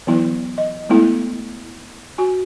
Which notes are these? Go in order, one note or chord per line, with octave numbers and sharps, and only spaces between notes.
E3 F#3 B3 E4
D#5
G#3 A3 B3 E4 A4
F#4 G#5